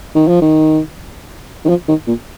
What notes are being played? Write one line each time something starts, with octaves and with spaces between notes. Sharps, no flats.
D#3
F3
D#3
D#3
F3
D#3
A#2